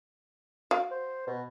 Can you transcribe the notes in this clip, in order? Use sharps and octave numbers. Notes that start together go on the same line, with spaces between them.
F#4 F5
C5
B2